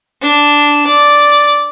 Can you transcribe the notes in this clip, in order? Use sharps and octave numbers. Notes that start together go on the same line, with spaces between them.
D4
D5